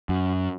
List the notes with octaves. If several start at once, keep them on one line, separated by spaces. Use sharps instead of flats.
F#2